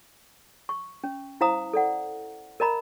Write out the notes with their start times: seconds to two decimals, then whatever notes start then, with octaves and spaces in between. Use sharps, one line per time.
0.69 C#6
1.04 C#4
1.41 E4 C5 F5 A#5 D#6
1.73 A4 D5 F#5
2.60 A#4 D#5 A#5 B5